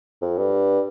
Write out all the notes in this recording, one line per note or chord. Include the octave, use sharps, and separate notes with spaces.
F2
G2